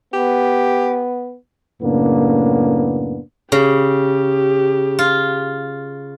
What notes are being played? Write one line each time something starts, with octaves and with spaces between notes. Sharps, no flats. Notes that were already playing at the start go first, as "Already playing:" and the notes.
B3 G4
F#2 A2 C#3 A#3 B3 D4
C#3 G4
F4